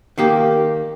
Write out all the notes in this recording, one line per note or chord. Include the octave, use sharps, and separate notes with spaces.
D#3 A#3 G4